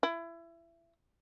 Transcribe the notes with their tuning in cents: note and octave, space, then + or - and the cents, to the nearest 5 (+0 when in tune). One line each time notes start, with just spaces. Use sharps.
E4 +25